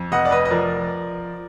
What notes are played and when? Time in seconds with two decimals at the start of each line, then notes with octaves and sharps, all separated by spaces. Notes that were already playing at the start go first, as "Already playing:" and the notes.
Already playing: F2
0.12 F1 D#5 F#5
0.25 D5
0.31 B4 D#5
0.45 D#5
0.51 F3 A#4 D5